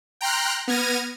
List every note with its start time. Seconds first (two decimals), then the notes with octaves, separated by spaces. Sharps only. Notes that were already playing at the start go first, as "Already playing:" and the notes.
0.21 G5 A#5 C6 F6 F#6
0.68 B3 F6 G#6 A#6 D#7